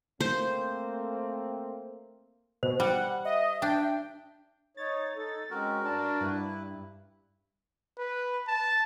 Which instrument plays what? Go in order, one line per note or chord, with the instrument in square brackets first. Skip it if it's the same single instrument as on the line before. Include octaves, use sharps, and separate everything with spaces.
[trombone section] A3 A#3 C4 [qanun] C5
[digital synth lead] B2 [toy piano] C5
[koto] G3 [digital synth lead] F#5
[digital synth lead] D#5 [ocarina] E5
[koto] D4 [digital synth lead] G5
[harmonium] D#4 C#5 [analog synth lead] A6
[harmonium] D#4 A4
[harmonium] G#3 C4 C#4 [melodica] F#4 A#4
[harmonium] G2 [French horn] D4 [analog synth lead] A5
[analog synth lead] G2 [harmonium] E4 B4
[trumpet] B4
A5